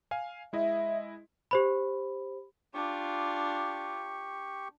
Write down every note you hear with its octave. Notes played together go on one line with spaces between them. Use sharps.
F5 G#5
G#3 E4 D#5 E5
G4 C5 B5
D4 F4 G4 C#6